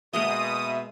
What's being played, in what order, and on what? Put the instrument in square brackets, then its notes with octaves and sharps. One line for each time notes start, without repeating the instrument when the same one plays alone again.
[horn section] B2 [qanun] G#3 A#3 D#5 [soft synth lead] E5 [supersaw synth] D#6